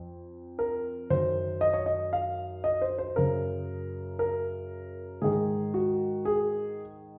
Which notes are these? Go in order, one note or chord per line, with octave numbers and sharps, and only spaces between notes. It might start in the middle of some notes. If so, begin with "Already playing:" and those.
Already playing: F2
A#4
F#2 D#3 C5
D#5
C#5
D#5
F5
D#5
C5
C5
F#2 C#3 A#4
A#4
G#2 D#3 G#4
F#4
G#4